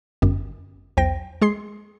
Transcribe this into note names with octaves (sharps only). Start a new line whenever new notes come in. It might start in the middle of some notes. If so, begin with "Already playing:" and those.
G1 F#2
B1 E2 C5 G5 A#6
G#3 G#4 C6 C7